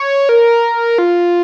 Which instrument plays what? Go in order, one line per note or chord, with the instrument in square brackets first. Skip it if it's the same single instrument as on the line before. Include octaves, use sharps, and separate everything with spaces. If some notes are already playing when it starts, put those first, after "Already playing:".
Already playing: [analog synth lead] C#5
A#4
F4